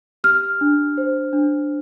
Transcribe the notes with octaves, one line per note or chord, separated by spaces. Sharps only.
G4 F6
D4
C5
D4